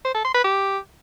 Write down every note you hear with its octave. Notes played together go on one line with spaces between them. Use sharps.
C5
A4
C6
B4
G4